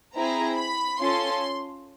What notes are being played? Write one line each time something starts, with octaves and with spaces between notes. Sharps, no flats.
C4 E4 G#4 A#5
B5
C#4 F4 A4 C6